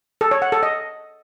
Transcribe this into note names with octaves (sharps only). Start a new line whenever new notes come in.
A4
C#5
F#5
A4
D#5